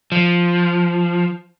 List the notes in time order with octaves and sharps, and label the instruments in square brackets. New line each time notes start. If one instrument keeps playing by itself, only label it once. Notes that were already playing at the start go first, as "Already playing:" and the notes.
[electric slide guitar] F3